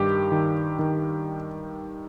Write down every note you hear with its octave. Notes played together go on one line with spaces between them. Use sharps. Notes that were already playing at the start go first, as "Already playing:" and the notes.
Already playing: G2 D#3 G4
D#3
D#3